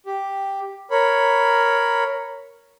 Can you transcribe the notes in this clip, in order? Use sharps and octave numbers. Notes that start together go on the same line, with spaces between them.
G4
A#4 C#5 B5